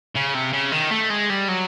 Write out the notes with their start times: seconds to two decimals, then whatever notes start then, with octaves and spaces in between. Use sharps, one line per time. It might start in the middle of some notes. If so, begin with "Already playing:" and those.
0.16 C#3
0.35 C3
0.53 C#3
0.72 D#3
0.91 A3
1.10 G#3
1.30 G3
1.48 F#3